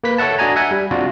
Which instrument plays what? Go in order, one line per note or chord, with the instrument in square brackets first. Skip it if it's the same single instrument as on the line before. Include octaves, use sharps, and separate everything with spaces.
[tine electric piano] A#3 B4 B6
A4 C#5 E5 F#5 A5
D4 F#4 D#5 G#5 A#5
E5 F#5 G#5
G3
C3 D4 F4 F#4